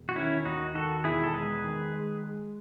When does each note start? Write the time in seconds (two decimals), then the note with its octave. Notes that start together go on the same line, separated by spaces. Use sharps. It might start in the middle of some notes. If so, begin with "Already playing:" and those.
Already playing: E1
0.09 F#4
0.16 D#3 C#4 E4
0.45 D#2 D#4 F#4
0.75 D#3 F#4 A4
1.04 E1 E4 G#4
1.24 A4
1.34 G#3 G#4 B4
1.64 D#3
1.93 G#3
2.23 G#3